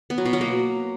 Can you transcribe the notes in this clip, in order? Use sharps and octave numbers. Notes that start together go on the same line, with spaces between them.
B3
F#3
B2
F#3
A#3